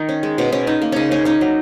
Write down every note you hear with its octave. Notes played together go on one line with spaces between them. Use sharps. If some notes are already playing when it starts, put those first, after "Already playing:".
Already playing: D#3 D#4
C#4
G#3
B2 C#4
B2 C#4
C#4 D#4
A#3
C#3 C#4 D#4
C#3 C#4
C#4 D#4
F#3